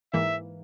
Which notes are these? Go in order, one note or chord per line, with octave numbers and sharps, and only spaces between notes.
G#2 E3 A#3 E5